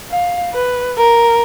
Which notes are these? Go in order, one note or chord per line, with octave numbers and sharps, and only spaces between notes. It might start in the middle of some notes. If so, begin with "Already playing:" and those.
F5
B4
A#4